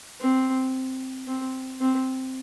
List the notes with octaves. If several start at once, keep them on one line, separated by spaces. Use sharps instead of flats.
C4
C4
C4